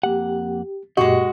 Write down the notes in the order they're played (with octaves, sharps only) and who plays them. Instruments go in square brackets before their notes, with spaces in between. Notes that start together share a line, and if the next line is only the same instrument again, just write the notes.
[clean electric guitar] F2 A#3 F#5 [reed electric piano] G4
[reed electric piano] F#2 A#2 G4 [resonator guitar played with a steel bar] G#3 F#4 [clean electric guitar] D#5